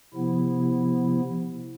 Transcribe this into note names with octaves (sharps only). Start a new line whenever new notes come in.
C3 F3 B3 E4